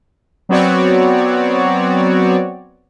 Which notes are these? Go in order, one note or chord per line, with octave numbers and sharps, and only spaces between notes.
F#3 B3 C4 F#4 C#5 D5